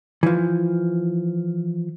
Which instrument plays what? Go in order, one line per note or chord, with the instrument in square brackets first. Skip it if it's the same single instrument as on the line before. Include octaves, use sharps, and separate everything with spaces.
[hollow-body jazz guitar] E3 F3